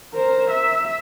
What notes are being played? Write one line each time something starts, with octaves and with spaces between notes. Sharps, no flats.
A#4 C5
E5